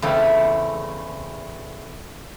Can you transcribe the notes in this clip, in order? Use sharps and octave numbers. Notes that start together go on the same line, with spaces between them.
E2 C#3 A3 C4